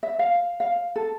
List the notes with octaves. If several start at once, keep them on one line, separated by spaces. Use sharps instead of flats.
E5
F5
F5
A4